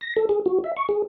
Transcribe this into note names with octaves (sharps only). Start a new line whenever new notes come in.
A#6
A4
G#4
F#4
E5
C#6
G#4